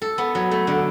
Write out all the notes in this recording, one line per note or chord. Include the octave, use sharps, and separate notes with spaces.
A4
B3
F#3
A3
D3